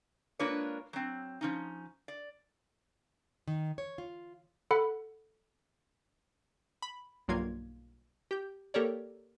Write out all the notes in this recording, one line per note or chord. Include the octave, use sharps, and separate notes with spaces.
G#3 A#3 D4 F4 B4 C#5
F#3 C4
F3 C#4 D#4
D5
D#3
C#5
F4
A4 F#5 B5
B5
B1 G2 F#3 A#3 F4 G#6
G4 G6
A#3 G4 A4 A#4 C#5 D5